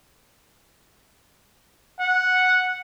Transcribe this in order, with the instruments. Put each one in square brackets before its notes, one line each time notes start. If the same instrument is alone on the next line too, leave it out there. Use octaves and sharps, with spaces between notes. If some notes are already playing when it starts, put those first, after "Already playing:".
[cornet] F#5